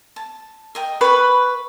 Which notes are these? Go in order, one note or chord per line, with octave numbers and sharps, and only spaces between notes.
A5
A#4 D#5 G5
B4 B5 C#6